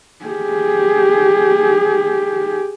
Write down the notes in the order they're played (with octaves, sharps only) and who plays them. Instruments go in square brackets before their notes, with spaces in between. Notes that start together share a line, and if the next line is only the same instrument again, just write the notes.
[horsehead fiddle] G4 G#4